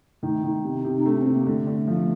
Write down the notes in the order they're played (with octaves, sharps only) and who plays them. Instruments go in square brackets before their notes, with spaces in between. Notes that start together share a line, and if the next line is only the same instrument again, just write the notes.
[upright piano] D#3 [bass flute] A3
[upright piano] D#3
C3
C3
[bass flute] D#4
[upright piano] A3 [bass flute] D4
[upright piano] C3 [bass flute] C4
[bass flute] A#3
[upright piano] D3 [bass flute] A3
[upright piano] D3
F3